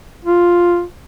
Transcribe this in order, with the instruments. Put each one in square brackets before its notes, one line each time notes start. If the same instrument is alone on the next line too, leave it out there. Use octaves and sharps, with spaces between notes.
[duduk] F4